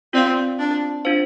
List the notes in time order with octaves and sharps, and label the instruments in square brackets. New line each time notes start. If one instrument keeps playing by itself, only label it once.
[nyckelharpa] C4 [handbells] F4 D5 F5
[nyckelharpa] D4
[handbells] D4 F4 C5 F5